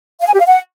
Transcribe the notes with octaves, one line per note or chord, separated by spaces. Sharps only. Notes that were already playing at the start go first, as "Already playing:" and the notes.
F5
G#5
G4
F5
F#5